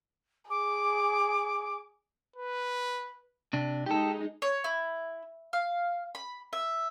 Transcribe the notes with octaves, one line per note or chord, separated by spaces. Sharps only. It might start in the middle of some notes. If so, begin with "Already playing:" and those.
G#4 D6
B4
C3 D4
G#3 D#4 G4 A4
C#5
E4
F5
B5
E5